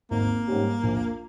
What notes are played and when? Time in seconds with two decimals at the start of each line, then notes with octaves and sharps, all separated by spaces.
0.11 G#1 A#3
0.48 G#2 G3 C#4 G4
0.83 A#1